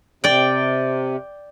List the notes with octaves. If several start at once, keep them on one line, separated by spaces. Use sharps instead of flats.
C3 D5 G5